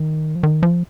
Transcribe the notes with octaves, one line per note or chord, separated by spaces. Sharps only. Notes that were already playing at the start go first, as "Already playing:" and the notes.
Already playing: D#3
F3
D#3
F3